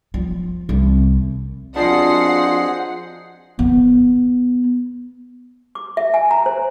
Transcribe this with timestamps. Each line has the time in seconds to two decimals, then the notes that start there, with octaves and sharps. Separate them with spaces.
0.14 F3
0.69 C2
1.76 F2 D4 F4 G#4 C5 D#5 F#5 C7
3.59 B3
5.75 D6
5.97 E5
6.14 G#5
6.31 A#5
6.46 C5